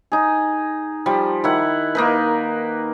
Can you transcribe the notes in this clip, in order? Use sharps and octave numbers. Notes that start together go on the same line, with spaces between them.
D#4 G#4
F3 G3
D#3 E4 F#5
A#3 D#4 B4